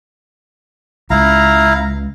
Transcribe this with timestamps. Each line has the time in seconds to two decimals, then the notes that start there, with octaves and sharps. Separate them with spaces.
1.10 C#2 E4 F5 A#5